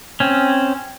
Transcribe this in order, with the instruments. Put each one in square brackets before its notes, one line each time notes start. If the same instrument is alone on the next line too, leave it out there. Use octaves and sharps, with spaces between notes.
[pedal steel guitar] C4 C#4